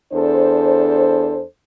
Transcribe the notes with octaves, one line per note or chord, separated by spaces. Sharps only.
E2 D4 A4 C5